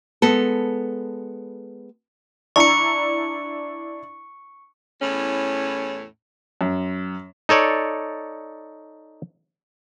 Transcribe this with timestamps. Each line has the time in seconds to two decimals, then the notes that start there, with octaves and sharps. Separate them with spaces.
0.22 G#3 B3 A4
2.56 D4 E4 A#5 C#6 C#7
5.02 E2 A2 C#4
6.61 F#2
7.49 D#4 A4 C#5 D5